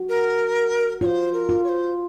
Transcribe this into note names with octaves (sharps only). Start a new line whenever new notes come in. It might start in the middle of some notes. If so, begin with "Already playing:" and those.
Already playing: F#4
A#4
F4 C5 C#5
A#4
F4
C#5
C5